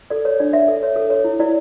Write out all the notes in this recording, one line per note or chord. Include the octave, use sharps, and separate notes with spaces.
A4 D5
C#5
D4 D5
D4 E5
A4
C#5
A4
C#5
E4
E4 D5